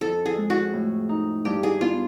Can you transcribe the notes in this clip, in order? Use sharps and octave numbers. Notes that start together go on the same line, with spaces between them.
F2 A4
G#4
G#3
F#4
A2
D#4
G2 G4
G#4
B3 F4